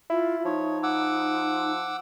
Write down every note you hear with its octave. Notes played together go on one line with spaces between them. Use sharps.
E4 F4
F3 D#4 C#5
F#5 D6 E6